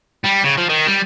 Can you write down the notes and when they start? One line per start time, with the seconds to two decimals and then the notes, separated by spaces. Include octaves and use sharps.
0.24 G3
0.44 C#3
0.57 F3
0.69 D#3
0.87 G3